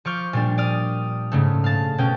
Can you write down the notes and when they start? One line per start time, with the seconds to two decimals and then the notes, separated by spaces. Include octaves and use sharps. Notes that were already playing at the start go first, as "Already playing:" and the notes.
0.05 F3 C#6 D6 F6 G6
0.33 A#2 G3 D4
0.58 D5 D#6 F6
1.32 G#2 C#3 A3
1.64 F5 A5
1.98 B2 C#4 G5